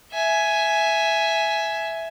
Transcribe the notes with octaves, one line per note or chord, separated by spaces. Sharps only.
E5 G#5